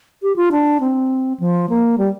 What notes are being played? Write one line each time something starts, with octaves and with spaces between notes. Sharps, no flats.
G4
F4
D4
C4
F3
A#3
G3